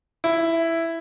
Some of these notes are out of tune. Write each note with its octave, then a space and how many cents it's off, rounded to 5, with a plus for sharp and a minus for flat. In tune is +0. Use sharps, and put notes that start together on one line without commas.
E4 +5